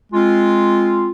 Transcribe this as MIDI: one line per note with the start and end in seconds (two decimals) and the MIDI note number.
0.13 1.11 56
0.13 1.11 60
0.13 1.11 65